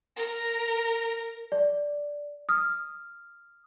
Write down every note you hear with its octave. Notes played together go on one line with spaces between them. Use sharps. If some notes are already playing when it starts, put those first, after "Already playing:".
A#4
D5
D#6 F6